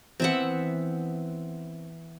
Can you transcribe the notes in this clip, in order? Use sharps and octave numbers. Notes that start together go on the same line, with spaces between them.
E3 B3 C4 E5 F#5